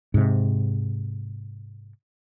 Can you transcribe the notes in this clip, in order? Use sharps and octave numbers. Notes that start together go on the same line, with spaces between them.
G#2 C3